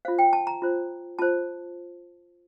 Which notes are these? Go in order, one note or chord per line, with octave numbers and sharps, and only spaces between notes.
F4 C5 F5
G5
A5
A#5
F4 C5
F4 C5 A5